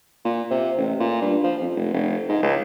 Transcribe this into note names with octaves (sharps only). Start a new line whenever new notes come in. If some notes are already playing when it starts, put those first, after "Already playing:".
A#2
C3
A1
A#2
G2
F3
F2
F1
F1
G#2
C#2